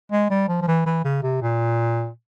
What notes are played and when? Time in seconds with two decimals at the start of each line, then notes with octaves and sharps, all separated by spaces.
0.12 G#3
0.31 G3
0.49 F3
0.62 F3
0.68 E3
0.86 E3
1.05 C#3
1.23 C3
1.42 A#2